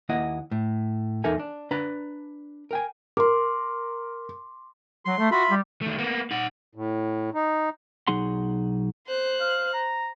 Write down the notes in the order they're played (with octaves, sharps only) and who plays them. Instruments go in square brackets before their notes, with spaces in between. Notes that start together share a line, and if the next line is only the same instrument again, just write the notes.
[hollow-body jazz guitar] D#2 A#3 E4 D#5 F#5
A2
E2 D#4 A4 A#4 E5 G#5
D4
D4 B4 A#5
A#4 G5 G#5
[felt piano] A#4 [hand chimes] C6 D6
[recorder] F#3 [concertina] C6
[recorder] A3
[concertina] F4 E5 B5 [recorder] F#4
[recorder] G3
[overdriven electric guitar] D#3 A3
A#3 B3
D#4 F#5
[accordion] A2
D#4
[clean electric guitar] B1 F#3 D#4 G#4 F#5 C6
[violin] C5 F#6
[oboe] F5
A#5